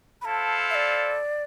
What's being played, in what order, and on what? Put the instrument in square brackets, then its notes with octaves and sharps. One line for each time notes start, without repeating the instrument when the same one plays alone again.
[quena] B5
[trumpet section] E4 A4 C5 F5 [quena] A5
[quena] E5
D5